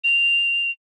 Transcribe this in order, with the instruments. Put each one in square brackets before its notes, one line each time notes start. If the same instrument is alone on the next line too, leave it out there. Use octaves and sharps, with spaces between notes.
[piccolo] F7